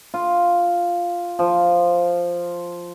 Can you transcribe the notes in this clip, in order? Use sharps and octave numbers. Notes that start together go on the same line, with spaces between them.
F4
F3